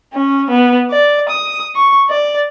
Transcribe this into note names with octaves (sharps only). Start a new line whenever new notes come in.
C#4
B3
D5
D#6
C#6
D5